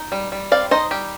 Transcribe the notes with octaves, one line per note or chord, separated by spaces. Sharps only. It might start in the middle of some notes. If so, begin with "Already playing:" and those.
Already playing: D#4
G3
G3
C4 D5 F5
D#4 C5 D#5
G3 G4